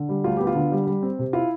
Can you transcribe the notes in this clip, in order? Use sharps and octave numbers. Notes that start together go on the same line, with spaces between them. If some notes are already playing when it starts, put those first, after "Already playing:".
Already playing: D3
G3
D2 F4
B3 G4
F4
D3
G3
G3
C4
C3
E4 F4